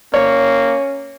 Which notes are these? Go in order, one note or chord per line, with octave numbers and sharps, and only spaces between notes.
A#3 C#4 C#5